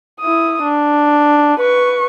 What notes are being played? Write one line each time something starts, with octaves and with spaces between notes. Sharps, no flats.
E4 D#6
D4
B4 C#6